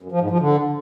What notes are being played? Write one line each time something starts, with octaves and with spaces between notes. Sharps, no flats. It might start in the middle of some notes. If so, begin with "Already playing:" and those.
F#2
F3
G#2
F3
D3